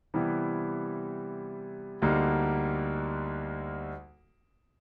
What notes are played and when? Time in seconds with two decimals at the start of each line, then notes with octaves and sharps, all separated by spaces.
0.14 C3 E3 G3 B3 E4
2.02 D2 D3 G3 A#3 D#4